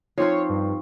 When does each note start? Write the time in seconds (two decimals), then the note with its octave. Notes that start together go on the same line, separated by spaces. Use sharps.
0.18 F3 C4 D#4 F4 C#5 C#6
0.49 G2